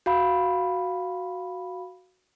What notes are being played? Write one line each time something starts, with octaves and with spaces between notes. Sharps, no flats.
F#4 F5 B5